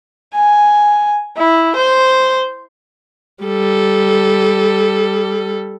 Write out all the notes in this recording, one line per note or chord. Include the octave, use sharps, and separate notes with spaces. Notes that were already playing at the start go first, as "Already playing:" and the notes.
G#5
E4
C5
G3 A4